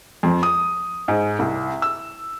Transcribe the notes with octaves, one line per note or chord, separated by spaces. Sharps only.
F2
D#6
G#2
C2
E6